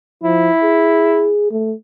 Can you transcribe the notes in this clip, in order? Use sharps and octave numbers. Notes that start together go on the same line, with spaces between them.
F3 E4
G#4
A3